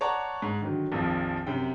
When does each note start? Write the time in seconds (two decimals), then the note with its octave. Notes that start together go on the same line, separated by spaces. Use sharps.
0.01 C#5 D5 F#5 A5 A#5 C#6
0.42 G#2
0.61 D3 D#3 F#3
0.92 A#1 F2 D#3 F3
1.46 F#2 C3 G5